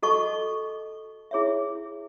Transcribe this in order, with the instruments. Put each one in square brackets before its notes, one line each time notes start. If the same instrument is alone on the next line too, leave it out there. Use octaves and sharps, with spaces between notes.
[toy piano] F#4 A4 D#5 A5 C#6
E4 G#4 C#5 E5